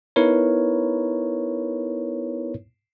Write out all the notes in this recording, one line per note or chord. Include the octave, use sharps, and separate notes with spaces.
B3 D#4 E4 A#4 B4 C#5